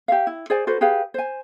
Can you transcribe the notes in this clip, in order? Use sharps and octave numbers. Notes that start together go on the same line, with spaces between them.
G4 E5 F5
E4
G#4 C5 D5 G#5
F#4 A4 B4 C5
G4 G#4 B4 F5
C5 G#5